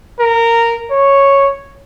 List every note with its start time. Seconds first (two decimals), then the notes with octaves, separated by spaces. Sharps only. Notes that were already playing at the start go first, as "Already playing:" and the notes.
0.19 A#4
0.91 C#5